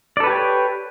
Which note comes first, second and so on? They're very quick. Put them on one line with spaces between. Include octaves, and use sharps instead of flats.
D5 A4 B4 G4 C#5